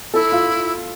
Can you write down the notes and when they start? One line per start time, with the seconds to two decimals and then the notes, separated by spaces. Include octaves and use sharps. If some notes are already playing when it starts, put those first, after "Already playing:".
0.14 E4 A4
0.32 F4